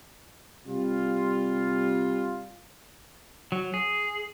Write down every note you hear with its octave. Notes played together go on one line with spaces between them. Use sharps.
C3 G3 F4
F#3
G#4